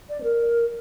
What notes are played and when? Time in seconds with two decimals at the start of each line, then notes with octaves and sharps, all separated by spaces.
0.10 D5
0.21 C5
0.24 A#4